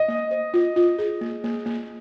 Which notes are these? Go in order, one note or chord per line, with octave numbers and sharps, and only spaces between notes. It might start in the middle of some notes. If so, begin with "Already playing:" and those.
Already playing: D#5
A#3
C5
F4
F4
G#4
A#3
A#3
A#3